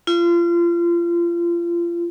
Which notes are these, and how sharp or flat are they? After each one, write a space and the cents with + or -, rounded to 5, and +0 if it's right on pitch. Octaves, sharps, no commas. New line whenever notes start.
F4 -30